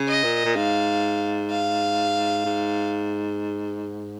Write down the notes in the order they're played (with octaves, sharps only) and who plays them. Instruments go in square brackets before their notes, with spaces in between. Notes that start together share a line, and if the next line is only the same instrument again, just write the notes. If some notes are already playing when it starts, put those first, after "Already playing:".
Already playing: [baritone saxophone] C#3
[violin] D#5
[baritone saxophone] A#2
A#2
[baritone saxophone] G#2 [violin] F5
[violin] F5
[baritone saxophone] G#2